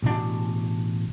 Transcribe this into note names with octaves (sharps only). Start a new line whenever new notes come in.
A1 B2 D4